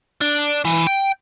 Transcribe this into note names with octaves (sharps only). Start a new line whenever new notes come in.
D4
E3
G5